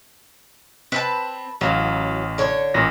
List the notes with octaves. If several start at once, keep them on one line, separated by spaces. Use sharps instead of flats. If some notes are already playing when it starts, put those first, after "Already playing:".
C4 B4 A5
A1 F#3 F5
D3 C#5
A1 A#2 A#6